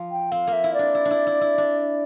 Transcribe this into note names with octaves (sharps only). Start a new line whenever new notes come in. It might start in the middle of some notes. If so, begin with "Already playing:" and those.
Already playing: F3
G5
C4 F5
A#3
E5
E4
D5
D4
E4
D4
E4
E4
E4
D4